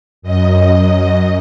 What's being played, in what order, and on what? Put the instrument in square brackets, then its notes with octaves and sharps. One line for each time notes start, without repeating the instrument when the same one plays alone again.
[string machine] F#2 D#5